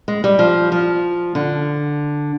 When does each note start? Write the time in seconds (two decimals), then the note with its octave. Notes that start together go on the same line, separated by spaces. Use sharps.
0.08 G#3
0.24 G3
0.39 F3
0.72 F3
1.35 D3